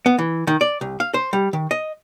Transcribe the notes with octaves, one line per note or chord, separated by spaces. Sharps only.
B3
E3
D#3
D5
C2
F5
C5
G3
D#3
D#5